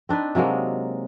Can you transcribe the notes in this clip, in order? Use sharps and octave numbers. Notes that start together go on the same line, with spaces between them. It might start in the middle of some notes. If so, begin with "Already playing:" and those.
C4 D4 D#4 B4
C3 F#3 G#3 A#3